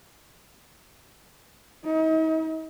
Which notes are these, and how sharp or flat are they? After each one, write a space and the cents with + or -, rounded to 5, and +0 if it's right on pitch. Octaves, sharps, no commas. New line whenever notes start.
D#4 +40